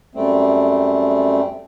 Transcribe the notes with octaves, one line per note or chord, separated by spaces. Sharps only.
F#2 G3 A3 C4